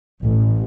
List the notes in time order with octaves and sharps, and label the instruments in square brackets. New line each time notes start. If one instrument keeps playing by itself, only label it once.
[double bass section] A1